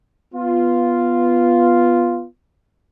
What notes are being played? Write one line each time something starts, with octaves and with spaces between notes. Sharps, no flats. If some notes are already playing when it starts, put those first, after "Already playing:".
B3 F4